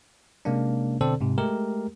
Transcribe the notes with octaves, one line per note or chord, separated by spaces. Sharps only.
C3 G#3 A#3 C#4 D4
B2 D3 C4 A4 C5 D5
G#2 C3
G#3 A3 G4 A#4